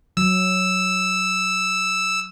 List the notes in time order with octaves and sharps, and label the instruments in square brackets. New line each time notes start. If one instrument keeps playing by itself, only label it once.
[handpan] F#3 [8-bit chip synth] E6